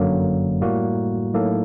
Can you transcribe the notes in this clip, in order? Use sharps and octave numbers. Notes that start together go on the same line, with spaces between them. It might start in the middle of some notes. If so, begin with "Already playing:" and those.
Already playing: G1 F#2 D3 F#3 A#3
A2 G3 A#3 F#4
A2 F#3 A#3 D#4 A4